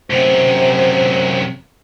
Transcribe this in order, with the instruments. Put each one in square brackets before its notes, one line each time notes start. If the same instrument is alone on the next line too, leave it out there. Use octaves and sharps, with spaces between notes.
[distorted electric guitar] F#2 C3 [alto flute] C5